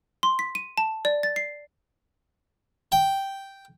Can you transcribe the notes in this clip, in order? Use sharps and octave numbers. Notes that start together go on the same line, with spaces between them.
C6
B6
D#7
A5
D5
A6
C7
G5